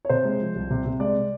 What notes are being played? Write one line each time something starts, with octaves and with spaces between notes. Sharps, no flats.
C#5
C3 C5
G#3
F3
C2
C3
C3
G#3 D5